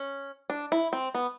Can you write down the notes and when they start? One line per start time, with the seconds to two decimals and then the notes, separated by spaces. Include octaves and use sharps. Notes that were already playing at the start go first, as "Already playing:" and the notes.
Already playing: C#4
0.50 D4
0.72 E4
0.93 C4
1.15 B3